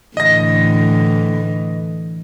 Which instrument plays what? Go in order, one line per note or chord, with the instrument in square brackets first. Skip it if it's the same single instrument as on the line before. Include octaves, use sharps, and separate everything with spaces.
[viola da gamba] A2 D3 E3 [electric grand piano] D#5 A#6